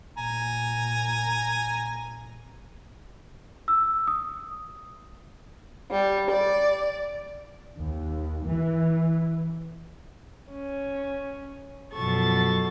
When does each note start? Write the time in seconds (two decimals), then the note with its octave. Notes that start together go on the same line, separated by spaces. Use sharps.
0.18 A#2 G#5 A#5
3.68 E6
4.07 D#6
5.91 G3
6.30 D5
7.78 D#2
8.46 E3
10.51 C#4
11.93 F#2 B2 F3 A4 C#6 A6